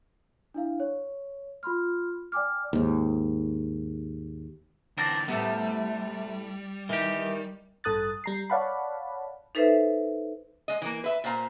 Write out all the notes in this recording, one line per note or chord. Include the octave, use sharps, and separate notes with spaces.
D4 E4 F5
C#5
F4 B5 C6 F6
D5 G5 G#5 D6 F6
D#2 G#2
D3 E3 C4 D4 A#4
A2 C3 G3 A3 B3
D#3 E3 G4
A1 G2 A4 D#6 F#6 A6
G3 A#5 C7
C#5 D5 F5 F#5 A5 B5
D#4 A4 B4 C5 E5
G#3 D#5
E3 A#3
B4 E5
A#2 A#3 C5 F5 A#5